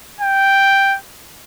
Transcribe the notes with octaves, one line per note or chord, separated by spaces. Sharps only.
G5